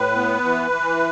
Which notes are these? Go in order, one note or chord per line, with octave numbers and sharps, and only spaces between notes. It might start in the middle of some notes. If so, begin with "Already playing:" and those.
Already playing: A2 B4
B3
E3
E3